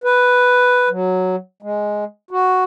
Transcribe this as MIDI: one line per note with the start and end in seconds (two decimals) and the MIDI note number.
0.04 0.89 71
0.89 1.36 54
1.63 2.04 56
2.31 2.64 66